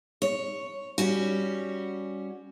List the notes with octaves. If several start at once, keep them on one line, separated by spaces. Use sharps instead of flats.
C#5
G3 C#4 F#4